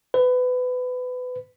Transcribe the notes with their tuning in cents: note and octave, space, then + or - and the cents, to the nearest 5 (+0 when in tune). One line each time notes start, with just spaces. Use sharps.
B4 +25